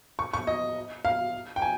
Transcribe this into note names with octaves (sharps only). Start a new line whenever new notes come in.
C#6
C#6
D#5
F5
G5
G#5